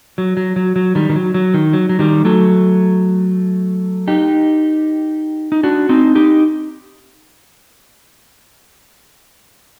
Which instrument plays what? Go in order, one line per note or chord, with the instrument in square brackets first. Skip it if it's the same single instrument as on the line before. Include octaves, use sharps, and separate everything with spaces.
[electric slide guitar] F#3
F#3
F#3
F#3
D#3 G3
D#3
F#3
F#3
D#3
F#3
F#3
D#3 G3
F#3 A3
D#4 G4
D#4
D4 F#4
C4 D#4
D#4 G4